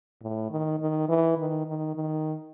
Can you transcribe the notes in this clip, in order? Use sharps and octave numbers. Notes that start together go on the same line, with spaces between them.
A2
D#3
D#3
E3
D#3
D#3
D#3